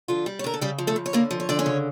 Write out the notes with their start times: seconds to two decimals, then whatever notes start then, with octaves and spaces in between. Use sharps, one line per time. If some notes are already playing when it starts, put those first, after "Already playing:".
0.08 D3 F3 F4
0.26 G3
0.39 C#5
0.44 D3 A#4
0.54 A4
0.61 C#3 G3 G4
0.78 F3
0.87 A3 A4
0.96 C#3
1.06 C#5
1.13 D3 A#3 A#4
1.31 F3
1.40 C#5
1.49 D3 D5
1.59 C#4 C#5
1.66 C#3